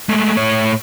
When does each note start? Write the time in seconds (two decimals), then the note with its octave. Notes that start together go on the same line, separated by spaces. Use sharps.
0.09 G#3 A3
0.37 A2 C#5